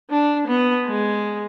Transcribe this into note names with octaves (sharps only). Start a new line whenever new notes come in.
D4
B3
G#3